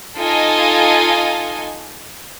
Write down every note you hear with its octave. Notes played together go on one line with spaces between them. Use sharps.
D#4 F4 A4 D#5 G#5